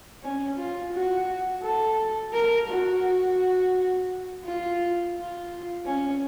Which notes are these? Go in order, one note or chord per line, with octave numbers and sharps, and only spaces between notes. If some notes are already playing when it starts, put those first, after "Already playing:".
C#4
F4
F#4
A4
A#4
F#4
F4
F4
C#4